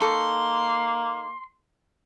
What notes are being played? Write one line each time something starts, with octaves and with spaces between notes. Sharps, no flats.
A#3 D#4 A4 C6 C#6